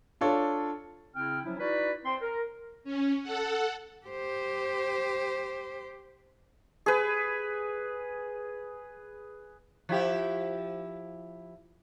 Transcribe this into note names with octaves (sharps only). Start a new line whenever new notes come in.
D4 F4 A4 C#5
C#3 C4 E4 G5 F6
F3 F#3 C#4 E4
D#4 E4 F#4 B4 D5
C4 C5 G5 C6
A#4
C#4
A4 F#5
G4 C5
G#4 B4
F3 E4 G4